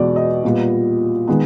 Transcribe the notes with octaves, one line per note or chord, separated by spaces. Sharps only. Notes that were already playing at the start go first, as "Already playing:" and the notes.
Already playing: E2 B2 G#3 B3 D5
D#5
A#2 G3 B3
D#3 G#3 B3